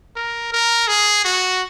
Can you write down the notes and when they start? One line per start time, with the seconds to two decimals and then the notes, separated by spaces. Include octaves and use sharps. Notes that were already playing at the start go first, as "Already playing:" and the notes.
0.16 A#4
0.52 A#4
0.88 G#4
1.25 F#4